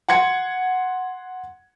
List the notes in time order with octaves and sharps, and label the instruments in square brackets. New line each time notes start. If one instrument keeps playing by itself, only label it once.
[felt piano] F#5 C6 G#6 C#7